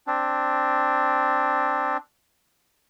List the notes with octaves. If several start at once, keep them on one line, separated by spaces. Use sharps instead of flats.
C4 D4